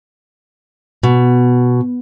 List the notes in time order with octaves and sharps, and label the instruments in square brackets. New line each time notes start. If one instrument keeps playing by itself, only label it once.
[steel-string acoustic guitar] B2